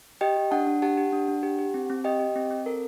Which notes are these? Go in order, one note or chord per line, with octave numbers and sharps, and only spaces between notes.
G4 D#5 G5
G4
D4 F#5 A5
D4
G4 F#5 A5
G4
D4
D4
G4
G4
C4
C4
G4 D#5 G5
G4
C4
C4
A4 A#4